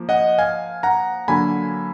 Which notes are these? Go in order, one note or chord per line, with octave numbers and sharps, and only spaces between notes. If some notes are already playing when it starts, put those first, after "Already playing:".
Already playing: F3 A#3
D#5 F#5
F5 G#5
F#5 A#5
D3 F#3 A#3 G#5 B5